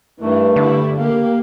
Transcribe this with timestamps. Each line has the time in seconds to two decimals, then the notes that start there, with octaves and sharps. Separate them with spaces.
0.21 G2 D#3 E3 A3
0.56 D3 G3 E4
0.97 A#3 G4 F5